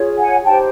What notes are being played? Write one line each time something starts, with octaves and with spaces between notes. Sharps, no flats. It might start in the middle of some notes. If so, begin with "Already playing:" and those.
Already playing: F4 G#4 C#5
F#5 G#5
D#4 G4 C5 G5 A5